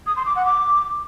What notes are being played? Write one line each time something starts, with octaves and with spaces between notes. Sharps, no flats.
D#6
C6
D6
F#5
D6